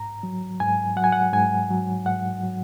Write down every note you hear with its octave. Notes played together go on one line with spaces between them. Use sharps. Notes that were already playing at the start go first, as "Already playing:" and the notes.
Already playing: G#2 A#5
F#3
G#2 G#5
F#3 F#5
G#5
F#5
G#2 G#5
F#3
G#2 F#5
F#3